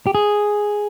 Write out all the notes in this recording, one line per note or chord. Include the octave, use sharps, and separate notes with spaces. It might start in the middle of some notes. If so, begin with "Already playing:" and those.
G4
G#4